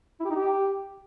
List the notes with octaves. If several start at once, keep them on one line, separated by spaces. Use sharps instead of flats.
E4
G4
D#4
G4